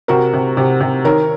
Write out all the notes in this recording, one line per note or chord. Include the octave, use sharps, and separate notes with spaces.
C3 F#4 A#4
C3
C3
C3
D#3 A#4 C#5